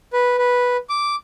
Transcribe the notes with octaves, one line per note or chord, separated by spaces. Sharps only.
B4
B4
D6